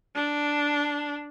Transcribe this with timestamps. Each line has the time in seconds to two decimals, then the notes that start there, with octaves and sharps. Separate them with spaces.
0.16 D4